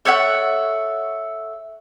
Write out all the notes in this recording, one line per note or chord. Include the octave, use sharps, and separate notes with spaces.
A4 C#5 E5 F#5